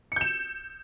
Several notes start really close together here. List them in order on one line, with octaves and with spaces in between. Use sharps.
C#7 G6 E7